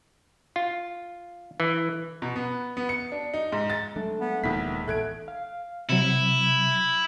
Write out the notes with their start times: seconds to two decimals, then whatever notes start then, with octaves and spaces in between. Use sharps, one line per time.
0.56 F4
1.60 E3
2.22 B2
2.36 B3
2.77 B3
2.89 C#7
3.12 D4
3.34 D#4
3.52 G#2
3.70 A6
3.96 F#3 G#3 A3 D4
4.20 B3
4.44 D#1 A#1 B2 D#3 G#3 B3 B6
4.88 A1 A3 F#6 G#6 D7
5.28 F5
5.89 C3 F#3 E4